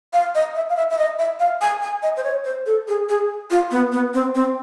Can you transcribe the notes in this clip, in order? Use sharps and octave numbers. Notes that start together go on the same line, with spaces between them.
F5
D#5
E5
F5
E5
E5
D#5
E5
F5
G#5
G#5
D#5
C5
C#5
C5
A4
G#4
G#4
F4
B3
B3
C4
C4